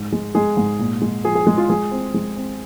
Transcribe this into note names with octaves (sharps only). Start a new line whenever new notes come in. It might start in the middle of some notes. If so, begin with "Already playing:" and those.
Already playing: G#2
G#3
G#3 G#4
G#2
A#2
G#3
F3 G#4
G#4
G#3 G#4
F4
G#3 G#4
C4
G#3
C4